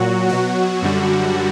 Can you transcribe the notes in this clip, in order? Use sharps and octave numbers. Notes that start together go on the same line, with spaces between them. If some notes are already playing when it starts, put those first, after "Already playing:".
Already playing: A#2 F#3 F#4
B2 F#3 F#4
F#2 D3 G3